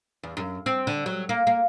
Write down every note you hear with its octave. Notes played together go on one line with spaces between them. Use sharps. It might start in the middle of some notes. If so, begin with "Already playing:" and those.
E2
F#2
C4
D3
F#3
A#3
A#3